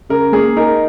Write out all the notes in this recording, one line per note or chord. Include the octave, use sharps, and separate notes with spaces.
C#3 A#4
A#3 G#4
D#4 A#4